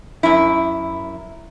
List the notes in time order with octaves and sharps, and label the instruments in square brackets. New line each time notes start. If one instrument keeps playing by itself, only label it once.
[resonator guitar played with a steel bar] F#2 E4